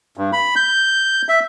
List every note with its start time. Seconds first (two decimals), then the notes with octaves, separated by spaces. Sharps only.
0.17 G2
0.33 B5
0.56 G6
1.29 E5